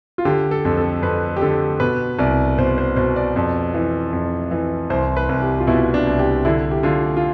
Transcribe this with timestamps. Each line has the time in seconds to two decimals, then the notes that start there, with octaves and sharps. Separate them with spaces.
0.18 F4
0.25 D3 G4
0.51 A4
0.65 F2
0.77 A4
1.02 F2 B4
1.37 G4
1.41 D3 A4
1.80 B2 B4
2.19 C2 D5
2.58 B2 C5
2.78 C5
2.96 B2 C5
3.16 D5
3.36 F2
3.74 E3
4.13 F2
4.51 E3
4.90 C2 C5
5.17 B4
5.29 C2
5.42 G4
5.60 F4
5.67 B2 E4
5.94 D4
6.07 C2
6.19 G4
6.45 D3 E4
6.71 G4
6.83 D3 F4
7.17 F4